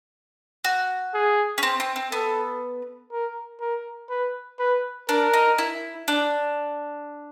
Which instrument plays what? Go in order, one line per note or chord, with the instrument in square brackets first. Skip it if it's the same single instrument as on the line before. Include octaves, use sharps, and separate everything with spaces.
[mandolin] F#4
[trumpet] G#4
[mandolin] C#4
C4
C4
C4
[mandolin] B3 [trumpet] A4
[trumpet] A#4
A#4
B4
B4
[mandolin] D4 [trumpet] A#4
[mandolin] D#4
E4
D4